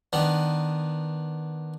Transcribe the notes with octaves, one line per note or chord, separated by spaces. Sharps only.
D#3 B3 D4